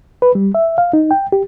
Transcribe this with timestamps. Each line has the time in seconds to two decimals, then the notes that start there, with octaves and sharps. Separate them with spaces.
0.22 B4
0.35 G3
0.55 E5
0.78 F5
0.93 D#4
1.11 G5
1.32 G4